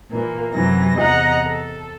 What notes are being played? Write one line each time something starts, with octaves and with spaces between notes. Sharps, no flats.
A#2 E3 A#3
F#2 C3 E3 F#3 A#6
E2 C3 D#5 F#5 A#5 F#6
A4